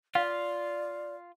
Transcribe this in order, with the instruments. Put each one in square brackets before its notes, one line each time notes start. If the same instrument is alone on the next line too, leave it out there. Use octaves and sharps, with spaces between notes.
[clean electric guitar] F4 [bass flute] D5 [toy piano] F5